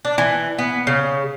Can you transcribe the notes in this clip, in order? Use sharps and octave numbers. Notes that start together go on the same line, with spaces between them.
D4
E3
B3
C#3